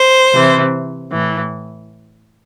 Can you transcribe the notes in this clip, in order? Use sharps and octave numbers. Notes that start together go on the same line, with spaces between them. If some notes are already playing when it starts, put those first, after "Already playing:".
Already playing: C5
C3 E3
A2 E3